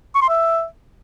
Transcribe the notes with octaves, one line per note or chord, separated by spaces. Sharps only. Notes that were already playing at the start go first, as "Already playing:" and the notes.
C#6
C6
E5